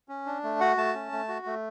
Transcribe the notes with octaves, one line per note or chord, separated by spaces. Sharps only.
C#4
D4
A3
F#4 F#5
A3 A5
C#4
A3
F#4
A3